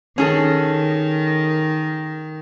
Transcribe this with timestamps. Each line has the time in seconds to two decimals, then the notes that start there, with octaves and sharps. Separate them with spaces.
0.18 D#3 C#4 G#4 A4